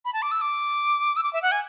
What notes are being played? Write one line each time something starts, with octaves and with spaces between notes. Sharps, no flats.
B5
A5
D6
E6
D6
E6
D6
E5
F#5
G#5